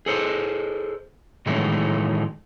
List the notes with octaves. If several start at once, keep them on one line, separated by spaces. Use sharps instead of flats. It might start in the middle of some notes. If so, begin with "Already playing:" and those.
G#4 A4 C5
A2 D#3 E3 F#3 G#3 A3